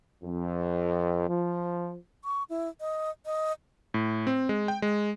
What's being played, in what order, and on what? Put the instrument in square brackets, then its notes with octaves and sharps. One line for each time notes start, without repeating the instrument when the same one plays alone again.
[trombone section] F2
F3
[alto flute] C#6
E4
D#5
D#5
[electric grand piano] A2
C4
G#3
G5
G#3